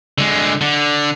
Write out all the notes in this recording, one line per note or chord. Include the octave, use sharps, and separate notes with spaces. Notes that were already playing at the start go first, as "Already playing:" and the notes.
D3 G#3
D3